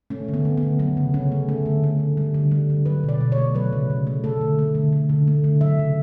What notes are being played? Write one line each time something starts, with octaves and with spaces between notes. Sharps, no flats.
A3 C#4
D3
B3
A3
B3
D3
F#3 B3
C#3
C#3 C#4
A3
A3
D3
A3
D3
G3
D3
G3
D3
F#3 B4
B2 D5
B2
C#5
A3
F#3 B4
C#3
C#3
A3
A3 A4
D3
A3
D3
A3
D3
A3
D3
F#3 E5
C#3